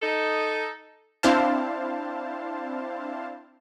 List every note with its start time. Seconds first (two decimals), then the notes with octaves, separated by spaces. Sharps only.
0.02 D#4 A4
1.23 C4 D4 E4 C5 F5 A5